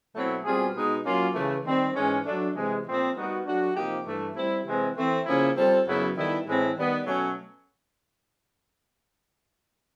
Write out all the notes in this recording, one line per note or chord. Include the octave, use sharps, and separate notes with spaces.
B2 F#3 A3 C4 E4
B2 G3 C4 F4 G#4
B2 G#3 B3 D#4
F#3 A#3 C#4 F4
C#3 E3 A3
D#3 G3 C4
G#2 E3 G#3 C#4
F#3 A3 D4
C3 E3 G#3
A#2 F3 A3 C4
G3 B3 D#4 F#4 A#4
F#3 A3 D4 F#4
C3 F3 A#3 D#4 G4
G2 E3 A3
G3 C4 E4
C3 E3 G#3 C4
E3 A3 C4
C#3 F3 A#3 C#4 E4
G3 C4 F4 A4
F#2 C#3 F#3 B3 E4
D#3 G3 B3 E4 A4
A2 E3 G#3 C4 E4
D#3 G3 B3
B2 F#3 A3 C#4